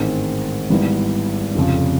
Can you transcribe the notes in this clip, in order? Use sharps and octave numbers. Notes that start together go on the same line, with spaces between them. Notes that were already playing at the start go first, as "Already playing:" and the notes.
Already playing: A1 G#2 D#3 G#3 C4
G#1 G#2 E3 G3 B3
F1 F2 C#3 F3